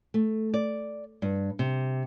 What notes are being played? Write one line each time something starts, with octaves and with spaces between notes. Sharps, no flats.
A3
D5
G2
C3